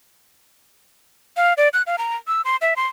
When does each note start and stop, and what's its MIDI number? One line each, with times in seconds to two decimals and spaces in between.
1.37 1.53 77
1.57 1.69 74
1.73 1.82 90
1.87 1.96 77
1.98 2.16 82
2.28 2.42 88
2.45 2.56 84
2.62 2.74 76
2.76 2.87 84